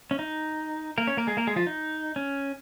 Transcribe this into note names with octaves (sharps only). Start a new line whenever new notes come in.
C#4
D#4
A#3 A#4
C#4 C#5
A#3 A#4
G#3 G#4
A#3 A#4
G#3 G#4
F3 F4
D#4
C#4